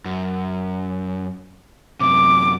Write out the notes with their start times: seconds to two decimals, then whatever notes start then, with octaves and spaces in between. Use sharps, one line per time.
0.05 F#2
2.00 F#2 C3 D6